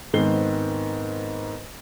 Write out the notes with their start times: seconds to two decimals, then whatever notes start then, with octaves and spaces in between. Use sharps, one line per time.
0.14 G#2 D#3 B3 C4 C7 G7